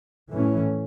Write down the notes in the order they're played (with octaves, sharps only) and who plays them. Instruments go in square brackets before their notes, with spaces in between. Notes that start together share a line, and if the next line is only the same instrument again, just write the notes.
[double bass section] A2 E3 A3 C#4